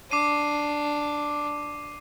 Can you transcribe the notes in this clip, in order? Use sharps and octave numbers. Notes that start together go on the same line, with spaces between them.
D4 D6 C7 D#7